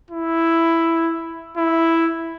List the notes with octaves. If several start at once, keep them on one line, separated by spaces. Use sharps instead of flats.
E4
E4